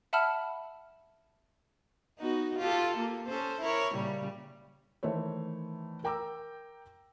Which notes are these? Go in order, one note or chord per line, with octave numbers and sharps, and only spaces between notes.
E5 F#5 A5 B5 E6 F6
B3 D#4 F#4
F4 G4 A4
A#3
C#4 A4 C5
E4 A#4 C#5
A#2 C#3 G3
D#3 E3 A3 C5 C#5
A#4 G5 A#5 D6 E6